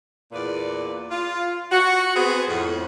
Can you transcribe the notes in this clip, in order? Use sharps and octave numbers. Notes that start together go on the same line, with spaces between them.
E2 A#2 B4 D5
F4
F#4
B3 C4 G#4
F2 A2